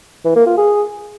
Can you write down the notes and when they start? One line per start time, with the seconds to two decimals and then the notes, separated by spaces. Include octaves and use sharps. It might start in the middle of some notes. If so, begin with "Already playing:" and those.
0.25 E3
0.36 A#3
0.46 F4
0.57 G#4